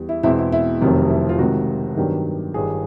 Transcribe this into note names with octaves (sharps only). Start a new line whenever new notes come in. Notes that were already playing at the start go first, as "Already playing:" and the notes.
Already playing: E2 G3
E4
E2 B2 G#3 C4 E4
E4
E4
F1 F2 C3 D#3 F#3
E4
F4
C#2 C3 D#3 F#4
G2 D#3 F#3 B3 D4 G4
G1 G2 D#3 G#4